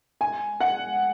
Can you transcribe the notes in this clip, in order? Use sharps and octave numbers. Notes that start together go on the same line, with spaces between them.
G#5
F#5